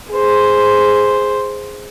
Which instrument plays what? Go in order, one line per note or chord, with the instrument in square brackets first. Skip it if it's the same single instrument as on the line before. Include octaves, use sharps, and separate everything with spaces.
[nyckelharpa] G#4 C5